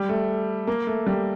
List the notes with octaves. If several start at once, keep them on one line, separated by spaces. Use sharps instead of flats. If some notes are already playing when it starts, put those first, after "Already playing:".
Already playing: G3
A3
A#3
A3
G3